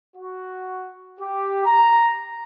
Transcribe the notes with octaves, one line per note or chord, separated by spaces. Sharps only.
F#4
G4
A#5